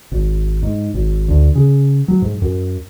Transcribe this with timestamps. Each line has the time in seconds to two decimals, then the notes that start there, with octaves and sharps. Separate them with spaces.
0.12 G#1
0.63 G#2
0.94 G#1
1.28 D2
1.55 C#3
2.08 F#3
2.22 G#2
2.42 F#2